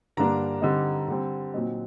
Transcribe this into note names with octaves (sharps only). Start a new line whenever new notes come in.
G2 D3 G3 A#3 D4 A#5
D3 G3 C4 D#4
D3 G3 C4
A#2 F#3 C4 D#4